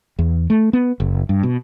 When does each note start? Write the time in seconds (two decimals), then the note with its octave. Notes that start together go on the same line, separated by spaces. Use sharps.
0.19 E2
0.50 A3
0.73 B3
1.00 F#1
1.29 G2
1.43 B2